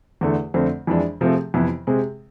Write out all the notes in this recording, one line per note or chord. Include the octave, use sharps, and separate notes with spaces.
E2 D3 A3
F2 D3 A3 C4
F2 E3 G#3 D4
C3 F3 A3 C4 G#4
F2 C3 E3 B3 E4
C3 G#3 C4 G#4